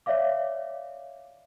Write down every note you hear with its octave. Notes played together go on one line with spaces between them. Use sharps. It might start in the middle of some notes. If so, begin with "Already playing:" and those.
C#5 D5 E5 F5 D6